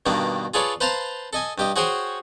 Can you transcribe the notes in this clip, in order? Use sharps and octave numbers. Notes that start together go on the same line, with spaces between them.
G2 B2 D#3 A#3 D4
F4 G#4 A4 B4 C#5 D5
B4 C5 F5 A5 A#5 C6
A4 D#5 G#5
G2 G4 D#5
F#4 G#4 C5 C#5 G5 G#5